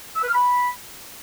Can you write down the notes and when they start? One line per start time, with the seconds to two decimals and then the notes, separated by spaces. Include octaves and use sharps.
0.16 E6
0.22 B4
0.28 F6
0.34 B5